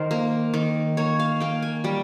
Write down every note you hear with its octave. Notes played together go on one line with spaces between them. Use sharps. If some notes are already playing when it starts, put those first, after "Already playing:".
Already playing: D#3 A#4 C5
A#3
D#3
A#3 C#5
F5
A#3 G5
G#5
G3 G5